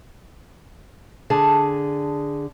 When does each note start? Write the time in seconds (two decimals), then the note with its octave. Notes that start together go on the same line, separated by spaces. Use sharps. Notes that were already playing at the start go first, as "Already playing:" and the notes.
1.30 D3 G#4 A5